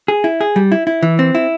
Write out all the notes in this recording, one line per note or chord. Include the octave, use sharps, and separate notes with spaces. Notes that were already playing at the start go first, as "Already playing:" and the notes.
G#4
E4
G#4
G3
E4
E4
E3
C4
E4